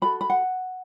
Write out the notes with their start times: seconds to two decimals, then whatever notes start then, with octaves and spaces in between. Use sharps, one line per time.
0.02 F#4 A4 B5
0.21 B5
0.30 F#5